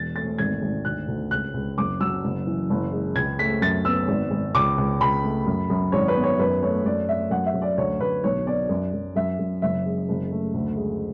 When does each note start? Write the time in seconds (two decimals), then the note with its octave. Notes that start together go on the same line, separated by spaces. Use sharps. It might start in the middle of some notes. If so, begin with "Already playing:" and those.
Already playing: E1 A6
0.16 A3 A6
0.39 G#1 G#6
0.62 G#1
0.85 D2 F#6
1.08 D2
1.31 C#2 F#6
1.54 C#2
1.78 F#1 D6
2.01 F#3 E6
2.24 F#1
2.47 E3
2.70 F#1
2.92 G#3
3.15 C#2 G#6
3.39 A3 B6
3.61 F#2 A6
3.85 B3 E6
4.08 G#1
4.31 G#1
4.54 C#2 D6
4.78 C#2
5.01 C#2 B5
5.24 A3
5.46 F#2
5.70 F#2
5.92 G#1 C#5
6.08 B4
6.15 B3
6.24 C#5
6.39 F#2 B4
6.62 A3 C#5
6.85 F#2 D5
7.09 A3 E5
7.31 F#2 F#5
7.46 E5
7.54 F#2
7.62 D5
7.78 D2 C#5
8.00 D2 B4
8.24 B1 C#5
8.46 B3 D5
8.69 F#2
8.93 F#2
9.16 F#2 E5
9.39 F#2
9.62 F#1 E5
9.85 G#3
10.09 F#1
10.31 A3
10.54 D2
10.77 G#3